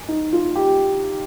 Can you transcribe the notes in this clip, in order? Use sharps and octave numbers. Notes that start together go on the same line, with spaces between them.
D#4
F4
G4